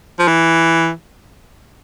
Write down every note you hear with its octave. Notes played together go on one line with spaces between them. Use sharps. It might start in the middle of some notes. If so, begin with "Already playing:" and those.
F3
E3